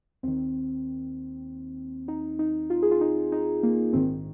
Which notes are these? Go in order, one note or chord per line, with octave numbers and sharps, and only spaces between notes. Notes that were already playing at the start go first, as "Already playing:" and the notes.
D#2 D#3 C4
D#4
D#4
F4
G#4
F4
D#4
D#4
A#3
A#1 G#2 D#3 C4